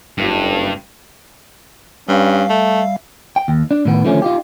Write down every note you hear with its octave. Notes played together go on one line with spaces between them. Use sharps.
F#1 G2
G2 G3 C#4 F5
A3 E5
G5
D#2
D4
A2 D#3 B3
D3 D#3 F3 A3 C#4
D#4 F4 G4